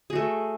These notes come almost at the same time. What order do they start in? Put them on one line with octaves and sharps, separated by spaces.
G#4 F#4 A3